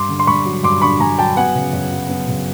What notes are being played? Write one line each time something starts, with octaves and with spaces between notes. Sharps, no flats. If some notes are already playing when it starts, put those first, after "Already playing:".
Already playing: G2 C6 D6
D3
C6
G2 B5 C#6
F#3
G2 C6 D6
D3 B5 C#6
G2 G#5 A#5
F#3 G5 A5
B3 F#5 G#5
C#3
F#2
F#3
B3
C#3